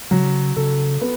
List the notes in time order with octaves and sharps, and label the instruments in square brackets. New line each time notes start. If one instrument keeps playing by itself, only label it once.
[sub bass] C#3 [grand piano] F#3
[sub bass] C#3 [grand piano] A4
[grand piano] B3